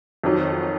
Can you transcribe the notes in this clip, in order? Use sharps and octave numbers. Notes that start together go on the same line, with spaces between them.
F2 D#3 F#3